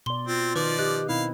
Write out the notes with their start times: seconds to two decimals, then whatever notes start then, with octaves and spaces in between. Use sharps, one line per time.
0.06 B2 D5 C6 G7
0.28 C4 F4
0.56 D#3 F3 D#4 B4 D5
0.79 G4 D#5 F#6
1.09 B2 C4 D#4 E4 F5